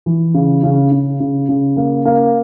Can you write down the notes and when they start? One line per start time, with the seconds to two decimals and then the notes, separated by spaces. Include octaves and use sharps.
0.06 E3
0.34 C#3
0.63 C#3
0.92 C#3
1.20 C#3
1.49 C#3
1.77 A#3
2.05 A#3